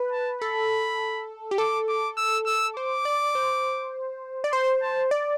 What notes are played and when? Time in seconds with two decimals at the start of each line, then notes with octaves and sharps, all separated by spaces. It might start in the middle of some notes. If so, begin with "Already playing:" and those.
Already playing: B4
0.12 A5
0.41 A4 B5
1.51 G4
1.58 A4 D6
1.88 D6
2.17 E6
2.47 E6
2.76 C5 D6
3.05 D5
3.35 C5
4.44 D5
4.52 C5 C6
4.82 A5
5.11 D5